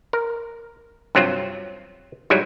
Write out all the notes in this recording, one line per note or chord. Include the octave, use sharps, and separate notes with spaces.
A#4
G2 C3 F#3 C4 F4
G#2 F#3 G3 E4 G#5